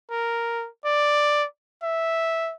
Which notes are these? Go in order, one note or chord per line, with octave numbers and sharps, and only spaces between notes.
A#4
D5
E5